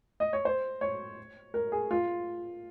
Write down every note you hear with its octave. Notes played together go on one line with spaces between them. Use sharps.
D#5
C#5
C5
C#5
A#4
G#4
F4